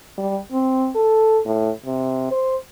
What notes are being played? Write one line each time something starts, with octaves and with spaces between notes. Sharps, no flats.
G3
C4
A4
A2
C3
C5